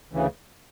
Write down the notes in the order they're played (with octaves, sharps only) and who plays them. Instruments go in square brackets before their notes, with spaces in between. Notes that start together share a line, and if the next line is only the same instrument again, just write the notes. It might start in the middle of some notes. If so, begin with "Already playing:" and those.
[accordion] D2 C#3 E3